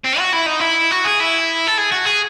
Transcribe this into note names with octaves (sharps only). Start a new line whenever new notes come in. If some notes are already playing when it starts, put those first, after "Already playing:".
C4
F#4
E4
D#4
E4
F#4
G#4
E4
A4
G#4
F#4
G#4